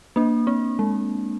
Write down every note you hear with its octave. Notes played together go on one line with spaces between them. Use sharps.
A#3 D4
C4
G#3